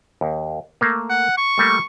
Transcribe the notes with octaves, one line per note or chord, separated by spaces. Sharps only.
D#2
A3 A#3
F#5
C#6
G3 A3 A#3